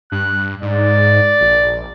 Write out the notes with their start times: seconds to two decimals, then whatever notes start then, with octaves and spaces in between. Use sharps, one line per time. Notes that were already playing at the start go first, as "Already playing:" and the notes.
0.12 G2 F#6
0.62 G#2 D5
1.41 A#1